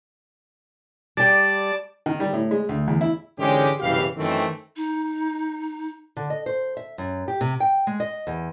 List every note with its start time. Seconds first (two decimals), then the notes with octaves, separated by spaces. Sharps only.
1.17 G3 D5 G5 A5
2.06 D#3
2.20 G3
2.33 A2
2.51 G#3
2.69 D2
2.88 E2
3.01 E4
3.38 G#2 D3 E3 G#3 C#4 G4
3.80 F#1 C2 B2 E3 G4 F5
4.17 F#2 D#3 E3 A3 C4
4.76 D#4
6.17 D3
6.30 D#5
6.46 C5
6.77 E5
6.98 F#2
7.28 G4
7.41 C3
7.60 G5
7.87 G#3
8.00 D#5
8.27 E2